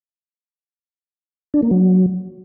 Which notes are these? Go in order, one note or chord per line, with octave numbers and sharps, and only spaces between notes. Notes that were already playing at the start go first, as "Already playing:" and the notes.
D4
A#3
F#3